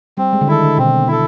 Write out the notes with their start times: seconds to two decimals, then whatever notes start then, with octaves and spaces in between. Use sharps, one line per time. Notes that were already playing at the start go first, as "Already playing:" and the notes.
0.17 G3 C4
0.33 G#3
0.41 D3
0.48 D#3 E4 A4
0.63 D3
0.77 B2 C4
1.07 E4 A4